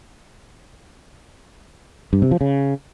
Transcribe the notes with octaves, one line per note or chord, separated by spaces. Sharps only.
G2
C3
F3
C#3